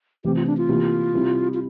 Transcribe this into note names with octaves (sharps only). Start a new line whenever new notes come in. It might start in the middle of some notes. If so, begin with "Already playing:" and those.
C3 E3 A3 C4 G4
F4
D4
F4
C3 E3 A#3 E4 G4
C3 G3 C4 E4
F4